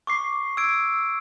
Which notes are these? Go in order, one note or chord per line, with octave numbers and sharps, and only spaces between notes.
C#6 D6 C7
E6 G#6 D7